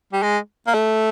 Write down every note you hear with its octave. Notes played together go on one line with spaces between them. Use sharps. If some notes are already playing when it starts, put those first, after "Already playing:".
G3
G#3
A#3
A3